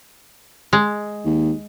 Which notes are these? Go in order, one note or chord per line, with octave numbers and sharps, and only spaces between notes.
G#3
D#2